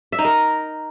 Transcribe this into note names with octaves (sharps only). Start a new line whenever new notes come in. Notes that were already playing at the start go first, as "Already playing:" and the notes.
E5
D#4
A#4